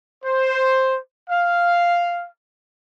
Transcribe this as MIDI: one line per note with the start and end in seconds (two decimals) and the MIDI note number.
0.25 0.98 72
1.30 2.28 77